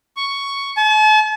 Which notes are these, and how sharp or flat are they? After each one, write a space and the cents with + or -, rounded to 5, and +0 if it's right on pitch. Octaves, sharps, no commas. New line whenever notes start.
C#6 +5
A5 -45